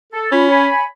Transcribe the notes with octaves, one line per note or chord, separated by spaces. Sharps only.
A4
C#4 F4 B5
C#5 G#5 B5